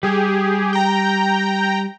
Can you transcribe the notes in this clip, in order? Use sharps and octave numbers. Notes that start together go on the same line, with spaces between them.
G3 G4 G#4
G5 A#5